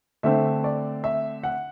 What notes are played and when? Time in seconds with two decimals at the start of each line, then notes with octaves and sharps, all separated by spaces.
0.23 D3 A3 C4 E5
0.64 D5
1.04 E5
1.44 F#5